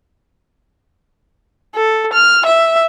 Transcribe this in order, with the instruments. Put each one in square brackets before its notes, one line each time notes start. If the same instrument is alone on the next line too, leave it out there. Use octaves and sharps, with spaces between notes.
[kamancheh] A4
F6
E5